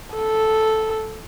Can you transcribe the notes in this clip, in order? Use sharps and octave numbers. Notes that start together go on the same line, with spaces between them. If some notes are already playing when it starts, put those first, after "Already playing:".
A4